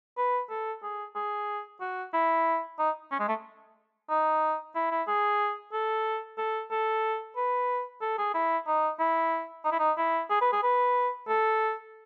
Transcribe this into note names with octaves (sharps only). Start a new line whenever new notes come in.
B4
A4
G#4
G#4
F#4
E4
D#4
C#4
G#3
A3
D#4
E4
E4
G#4
A4
A4
A4
B4
A4
G#4
E4
D#4
E4
D#4
E4
D#4
E4
G#4
B4
G#4
B4
A4